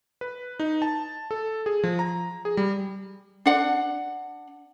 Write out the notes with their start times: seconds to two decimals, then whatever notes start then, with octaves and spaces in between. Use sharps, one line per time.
0.21 B4
0.60 D#4
0.82 A5
1.31 A4
1.66 G#4
1.84 F3
1.99 A#5
2.45 G#4
2.57 G3
3.46 D4 F#5